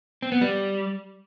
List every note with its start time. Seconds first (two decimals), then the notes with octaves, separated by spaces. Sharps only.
0.22 C4
0.32 B3
0.41 G3